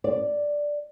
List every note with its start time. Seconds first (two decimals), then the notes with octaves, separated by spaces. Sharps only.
0.04 D5